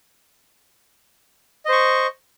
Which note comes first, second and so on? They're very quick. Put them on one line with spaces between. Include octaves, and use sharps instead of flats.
D#5 C5 C#6